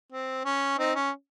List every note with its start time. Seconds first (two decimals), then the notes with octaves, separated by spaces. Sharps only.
0.12 C4
0.45 C#4
0.78 C4 D#4
0.95 C#4